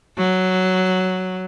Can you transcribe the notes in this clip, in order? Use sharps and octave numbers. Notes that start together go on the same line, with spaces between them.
F#3